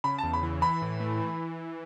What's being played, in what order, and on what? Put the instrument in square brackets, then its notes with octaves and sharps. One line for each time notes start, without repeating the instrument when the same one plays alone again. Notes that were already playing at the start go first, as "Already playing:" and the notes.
[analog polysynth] C#3 [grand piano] B5
[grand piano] A5
[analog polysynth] E2
[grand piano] B5
[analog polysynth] E3
[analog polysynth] E3 [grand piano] B5
[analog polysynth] A2
A3
E3